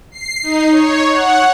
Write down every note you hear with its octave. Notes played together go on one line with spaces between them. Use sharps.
C7
D#4
C#5
F#5